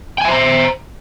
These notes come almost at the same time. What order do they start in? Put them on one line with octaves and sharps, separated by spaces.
G5 G#5 E5 C5 A#5